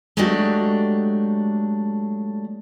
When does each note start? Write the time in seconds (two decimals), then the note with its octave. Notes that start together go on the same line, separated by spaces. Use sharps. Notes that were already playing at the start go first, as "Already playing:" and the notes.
0.17 F#3 G#3 A3 D4 F#4 G4